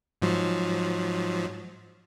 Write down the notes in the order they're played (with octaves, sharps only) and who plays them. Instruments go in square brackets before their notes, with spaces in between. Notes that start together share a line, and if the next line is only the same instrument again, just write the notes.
[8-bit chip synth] G#2 F3 F#3